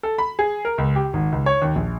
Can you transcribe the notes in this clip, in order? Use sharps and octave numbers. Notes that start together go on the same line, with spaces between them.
A4
B5
G#4
A#4
C#2
G4
G#1
C#2
C#5
D#2
A#1